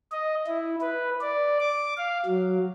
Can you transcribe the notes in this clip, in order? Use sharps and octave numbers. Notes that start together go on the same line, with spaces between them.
D#5
E4
B4
D5
D6
F5
F#3